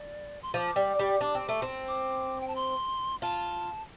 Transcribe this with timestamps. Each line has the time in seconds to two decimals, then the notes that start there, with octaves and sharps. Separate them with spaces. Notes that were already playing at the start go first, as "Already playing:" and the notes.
Already playing: D5
0.42 C6
0.54 F3 D6
0.76 G3
0.99 G3
1.21 D4
1.35 C4
1.49 A3
1.62 C4
1.88 D6
2.40 G5
2.48 A5
2.55 C6
3.22 F4 A5